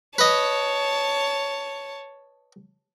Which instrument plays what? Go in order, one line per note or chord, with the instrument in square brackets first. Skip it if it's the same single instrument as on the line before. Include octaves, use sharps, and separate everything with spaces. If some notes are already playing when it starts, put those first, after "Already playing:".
[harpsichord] B4 D#5 [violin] C#5 A5